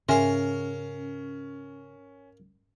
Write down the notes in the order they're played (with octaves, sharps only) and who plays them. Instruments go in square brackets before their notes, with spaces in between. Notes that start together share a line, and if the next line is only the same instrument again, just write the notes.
[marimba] G#2 E5 G#5 [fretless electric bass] C#3 [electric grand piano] C#4 [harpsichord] A#4 F5